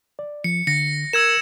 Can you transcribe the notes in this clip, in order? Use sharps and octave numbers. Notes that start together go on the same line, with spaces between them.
D5
F3 C#7
D3 A#6 C#7
A#4 E6 G#6 E7